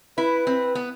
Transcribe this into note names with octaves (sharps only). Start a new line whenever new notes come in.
E4 B4
C4
B3